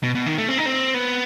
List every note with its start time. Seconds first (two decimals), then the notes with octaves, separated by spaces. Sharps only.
0.03 B2
0.15 B2
0.26 D#3
0.38 A3
0.48 C4
0.58 D#4
0.66 C4
0.94 B3